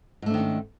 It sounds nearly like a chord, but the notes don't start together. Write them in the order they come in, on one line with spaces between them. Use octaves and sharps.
G#2 A3 D4 D#3 C#4